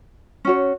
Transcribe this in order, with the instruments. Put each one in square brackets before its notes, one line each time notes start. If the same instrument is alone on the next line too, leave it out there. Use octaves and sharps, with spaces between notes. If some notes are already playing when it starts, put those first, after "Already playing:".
[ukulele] C#4 F#4 C#5